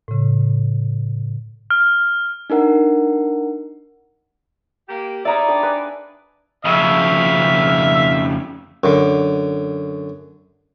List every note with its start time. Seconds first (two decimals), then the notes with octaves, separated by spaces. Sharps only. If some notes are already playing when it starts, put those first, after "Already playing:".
0.08 A2 C#3
1.70 F6
2.50 D4 D#4 A#4 F#5
4.88 A#3 G4
5.25 D#4 G#4 D5 E5 A#5 B5
5.48 D4 G5 D6
5.63 B4 G#5
6.65 F2 C#3 E5 F5
8.84 F#2 D3